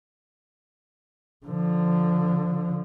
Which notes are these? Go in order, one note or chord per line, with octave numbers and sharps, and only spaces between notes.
D3 F3